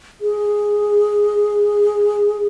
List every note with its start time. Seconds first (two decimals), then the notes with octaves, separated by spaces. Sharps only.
0.21 G#4